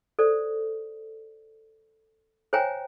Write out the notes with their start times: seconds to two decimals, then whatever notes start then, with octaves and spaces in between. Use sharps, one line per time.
0.19 A4 C5 D5
2.53 C5 C#5 E5 G5 G#5 A#5